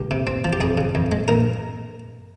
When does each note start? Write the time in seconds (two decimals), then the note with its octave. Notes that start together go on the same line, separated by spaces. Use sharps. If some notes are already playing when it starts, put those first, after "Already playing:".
Already playing: C#2 G4
0.11 C3
0.27 C4
0.44 F3
0.53 G4
0.60 F2 G#4
0.78 C#3
0.95 F2
1.12 G#3
1.28 A#1 A#4